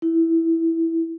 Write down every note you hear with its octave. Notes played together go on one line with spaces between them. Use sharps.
E4